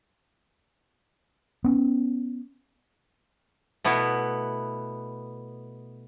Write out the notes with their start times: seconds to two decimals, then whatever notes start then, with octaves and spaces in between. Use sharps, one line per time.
1.64 B3 C#4
3.84 B2 A3 B3 E4